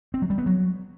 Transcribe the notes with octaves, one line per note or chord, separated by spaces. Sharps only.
C4
F#3
G3
B3
F#3